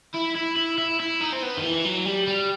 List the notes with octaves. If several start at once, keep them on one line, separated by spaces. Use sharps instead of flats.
E4
E4
E4
E4
E4
D#4
C4
B3
D#3
E3
F#3
G3
G3